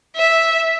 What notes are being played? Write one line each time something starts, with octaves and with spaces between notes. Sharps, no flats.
E5